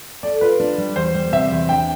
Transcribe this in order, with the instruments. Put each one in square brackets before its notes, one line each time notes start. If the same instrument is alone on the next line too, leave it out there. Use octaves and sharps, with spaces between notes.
[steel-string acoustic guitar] A4 [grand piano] D5
[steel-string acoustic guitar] F4 [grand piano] B4
[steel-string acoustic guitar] D4
G3
[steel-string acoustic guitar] E2 [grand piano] C5
[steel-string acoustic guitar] G3
[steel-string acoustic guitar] C3 [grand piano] E5
[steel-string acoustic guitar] E2
[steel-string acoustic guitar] D4 [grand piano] G5